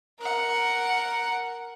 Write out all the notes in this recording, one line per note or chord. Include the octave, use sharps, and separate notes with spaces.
A#4 F#5